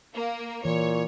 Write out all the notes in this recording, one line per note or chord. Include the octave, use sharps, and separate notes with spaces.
A#3
A#2 E3 C#5